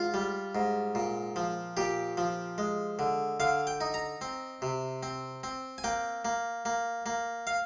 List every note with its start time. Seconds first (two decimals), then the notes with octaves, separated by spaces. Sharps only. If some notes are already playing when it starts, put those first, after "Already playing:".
Already playing: G#2 F4
0.14 G3
0.55 G#2
0.95 A#2
1.36 F3
1.77 A#2 G4
2.17 F3
2.58 G#3
2.99 D3
3.40 D3 F5
3.67 G5
3.81 D#4
3.94 A#5
4.21 C4
4.62 C3
5.03 C4
5.43 C4
5.78 G#5
5.84 A#3 G5
6.25 A#3
6.65 A#3
7.06 A#3
7.47 F5